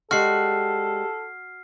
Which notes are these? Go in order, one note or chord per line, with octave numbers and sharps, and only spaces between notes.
G3 G#3 F#4 A4 F6 C7